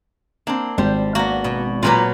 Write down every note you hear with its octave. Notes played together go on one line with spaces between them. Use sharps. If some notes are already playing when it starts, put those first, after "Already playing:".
A#3 C4 D4
G#1 G3 C5
A#3 B3 F#4
B2
A#2 F#3 F4 G4 B4 A#5